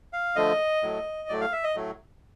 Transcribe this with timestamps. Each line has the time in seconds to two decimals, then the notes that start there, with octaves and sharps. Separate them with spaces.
0.13 F5
0.36 D3 F3 A3 D#5
0.82 A2 F#3 A3
1.29 A2 F#3 A3 D5
1.41 F5
1.52 E5
1.64 D#5
1.75 A2 F#3 A3